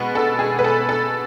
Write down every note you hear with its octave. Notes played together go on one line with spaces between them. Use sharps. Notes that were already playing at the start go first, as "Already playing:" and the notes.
Already playing: B2 G#3 B3 B4
A4
G#4
B4
A4
A4